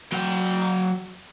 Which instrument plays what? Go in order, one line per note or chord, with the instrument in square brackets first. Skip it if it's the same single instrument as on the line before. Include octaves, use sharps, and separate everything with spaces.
[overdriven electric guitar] F#3 G5